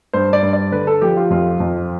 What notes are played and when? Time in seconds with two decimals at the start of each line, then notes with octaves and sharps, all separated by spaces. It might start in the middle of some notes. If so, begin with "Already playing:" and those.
0.13 G2 C5
0.33 D5
0.42 G2
0.53 D5
0.72 D3 B4
0.87 A4
1.01 F3 G4
1.17 F4
1.30 F2 F4
1.60 F2